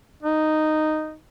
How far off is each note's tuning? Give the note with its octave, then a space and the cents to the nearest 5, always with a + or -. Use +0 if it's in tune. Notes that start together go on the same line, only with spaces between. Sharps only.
D#4 -5